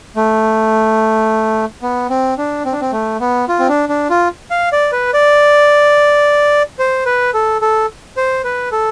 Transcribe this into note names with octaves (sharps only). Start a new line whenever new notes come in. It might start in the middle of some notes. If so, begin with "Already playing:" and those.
A3
B3
C4
D4
C4
D4
C4
A3
B3
F4
C4
D4
D4
F4
F5
D5
B4
D5
C5
B4
A4
A4
C5
B4
A4